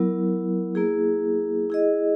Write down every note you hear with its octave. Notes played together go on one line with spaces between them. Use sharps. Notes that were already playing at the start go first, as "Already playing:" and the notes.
Already playing: F#3 B3 E4 A#4
A#3 E4 G#4
E4 G#4 D#5